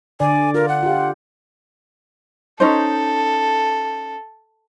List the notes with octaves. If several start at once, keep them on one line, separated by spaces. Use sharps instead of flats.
D3 D5 G#5
F4 A#4
F#5
F4 G4
C#4 D#4 A4 C5